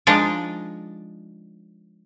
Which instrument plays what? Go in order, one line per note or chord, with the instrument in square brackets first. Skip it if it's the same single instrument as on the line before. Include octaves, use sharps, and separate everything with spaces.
[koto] F3 G#3 D4 D#4